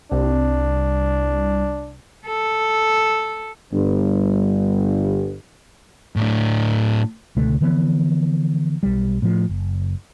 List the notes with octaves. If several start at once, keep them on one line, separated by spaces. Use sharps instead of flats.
C2 D4
A4
G1 G2
A2 D4
C#2 B2 D3 A3
D3 E3 F3 B3
B1 G3
A2 F3
F#1